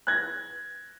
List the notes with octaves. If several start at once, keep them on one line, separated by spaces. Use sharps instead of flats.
F#6 G#6 A#6